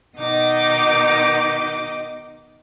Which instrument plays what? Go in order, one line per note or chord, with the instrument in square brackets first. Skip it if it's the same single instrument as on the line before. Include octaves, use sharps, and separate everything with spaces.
[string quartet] B2 D#3 D#4 D#5 D6